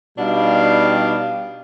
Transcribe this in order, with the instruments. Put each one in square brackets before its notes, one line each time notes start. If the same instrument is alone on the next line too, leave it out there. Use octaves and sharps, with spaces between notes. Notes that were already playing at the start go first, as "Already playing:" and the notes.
[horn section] B2 G3 D4 D#4 F5